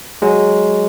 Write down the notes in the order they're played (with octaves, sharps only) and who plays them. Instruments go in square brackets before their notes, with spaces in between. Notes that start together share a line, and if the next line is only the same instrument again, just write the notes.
[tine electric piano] F#3 G#3